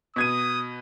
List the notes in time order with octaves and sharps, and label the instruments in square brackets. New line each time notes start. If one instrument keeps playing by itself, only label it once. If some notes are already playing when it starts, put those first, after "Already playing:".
[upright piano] B2 G#6 D#7 [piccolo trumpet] D#6